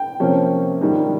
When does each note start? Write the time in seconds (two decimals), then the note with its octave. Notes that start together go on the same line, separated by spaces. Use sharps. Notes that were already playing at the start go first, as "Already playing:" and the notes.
Already playing: G5
0.20 C3 F3 A#3 C#4
0.81 G#2 D#3 G3